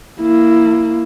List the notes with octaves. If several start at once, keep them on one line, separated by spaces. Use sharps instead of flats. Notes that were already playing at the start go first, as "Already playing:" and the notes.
A#3 E4